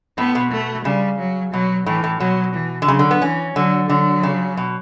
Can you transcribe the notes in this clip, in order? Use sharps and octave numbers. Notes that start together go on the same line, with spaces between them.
A2 B3
B2
A3
C#3 G3
F#3
B2 F#3
A2 E3
A2
B2 F#3
E3
D3
C#3 F#3
D3
B3
E3 C#4
D3 F#3
D3 F#3
C#3
B2